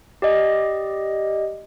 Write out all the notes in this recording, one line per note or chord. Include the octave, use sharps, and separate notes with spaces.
G4 D5 D#5